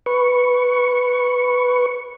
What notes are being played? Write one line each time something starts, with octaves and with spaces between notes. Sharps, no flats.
B4 C#6